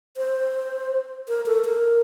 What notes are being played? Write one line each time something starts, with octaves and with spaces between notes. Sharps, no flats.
C5
A#4
A4
A#4